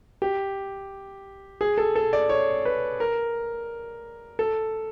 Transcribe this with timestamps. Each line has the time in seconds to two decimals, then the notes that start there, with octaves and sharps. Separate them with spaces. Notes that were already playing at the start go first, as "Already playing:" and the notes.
0.22 G4
1.61 G#4
1.78 A4
1.96 A4
2.13 D5
2.29 C#5
2.65 B4
3.00 A#4
4.39 A4